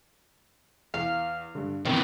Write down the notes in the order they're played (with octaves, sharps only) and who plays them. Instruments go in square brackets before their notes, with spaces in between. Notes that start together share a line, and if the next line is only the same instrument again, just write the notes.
[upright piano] E2 [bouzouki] F5
[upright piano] G2 D3
[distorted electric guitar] C3 E3 [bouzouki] D#3 [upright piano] B3 G5